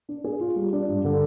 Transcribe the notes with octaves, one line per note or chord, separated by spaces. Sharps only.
D4
G#4
F4
G3
D4
G2
D3